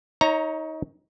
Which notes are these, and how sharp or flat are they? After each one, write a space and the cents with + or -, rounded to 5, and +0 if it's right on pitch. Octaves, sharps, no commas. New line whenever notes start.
D#4 +25 C#5 +0 A#5 +0